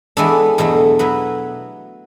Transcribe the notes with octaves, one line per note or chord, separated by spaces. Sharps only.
E3 G#3 B3 D4 A4
E2 B2 F#3 A3
F#3 B3 E4 B4